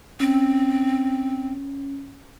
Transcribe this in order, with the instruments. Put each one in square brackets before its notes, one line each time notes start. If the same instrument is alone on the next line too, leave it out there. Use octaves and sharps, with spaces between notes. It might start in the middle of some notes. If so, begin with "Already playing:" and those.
[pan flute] C4 [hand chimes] C#4